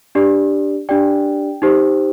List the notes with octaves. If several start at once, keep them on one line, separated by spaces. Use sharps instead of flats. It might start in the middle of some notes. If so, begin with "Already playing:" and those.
D4 G4 D5
D4 G4 D5 G5
D#4 G4 C5